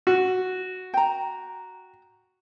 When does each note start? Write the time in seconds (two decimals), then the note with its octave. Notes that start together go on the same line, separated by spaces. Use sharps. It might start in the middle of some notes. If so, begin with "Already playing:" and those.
0.07 F#4
0.94 G5 A#5